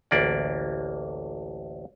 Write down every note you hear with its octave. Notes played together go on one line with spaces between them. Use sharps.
A1 D2 A#3 D5